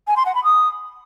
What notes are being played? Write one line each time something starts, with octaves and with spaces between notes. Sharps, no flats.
G#5
C6
F#5
B5
D#6